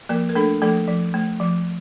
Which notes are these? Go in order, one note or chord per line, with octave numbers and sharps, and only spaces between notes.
F3 A#3 A#4
A#4
A3 D4 A4
F3 A3 A4
F3
A3
F3